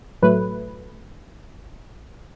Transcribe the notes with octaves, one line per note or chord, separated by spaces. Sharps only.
A2 F#3 A3 B4